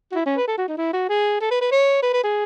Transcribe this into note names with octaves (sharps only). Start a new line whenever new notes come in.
F#4
E4
C#4
B4
A4
F#4
D#4
E4
F#4
G#4
A4
B4
B4
C#5
B4
B4
G#4